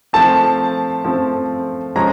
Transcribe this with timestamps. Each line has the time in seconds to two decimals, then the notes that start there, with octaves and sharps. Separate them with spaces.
0.13 F3 A3 C4 A5
1.04 F3 A3 C4
1.95 F3 G#3 C#4 A#5